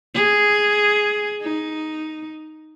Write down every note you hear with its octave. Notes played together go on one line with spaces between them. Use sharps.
G#4
D#4